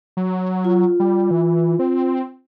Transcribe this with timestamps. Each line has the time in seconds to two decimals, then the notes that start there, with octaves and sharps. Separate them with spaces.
0.17 F#3
0.65 F4
1.00 G3
1.31 E3
1.79 C4